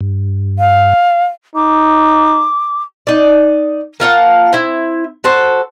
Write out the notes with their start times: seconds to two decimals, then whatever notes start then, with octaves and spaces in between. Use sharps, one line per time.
0.01 G2
0.59 F5
1.55 D#4 D6
3.07 D#4 D5
4.00 A#3 F4 F#5 A5
4.53 C4 E4
5.24 F#4 A4 C5